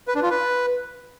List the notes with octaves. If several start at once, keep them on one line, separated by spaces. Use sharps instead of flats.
B4
D4
F4
B4